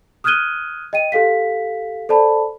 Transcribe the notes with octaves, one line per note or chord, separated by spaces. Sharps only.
D#6 F6 F#6 G#6 D#7 G7
D#5 G5 D#7
G4 A4 F5 B6
A4 C5 D5 A5 B5